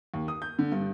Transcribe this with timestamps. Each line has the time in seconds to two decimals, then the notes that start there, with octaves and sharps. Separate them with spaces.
0.14 D#2
0.28 D#6
0.42 G6
0.59 D3
0.72 G2